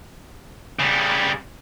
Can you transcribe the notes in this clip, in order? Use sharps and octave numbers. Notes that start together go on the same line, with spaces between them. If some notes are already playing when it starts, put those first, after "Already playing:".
C#3 G3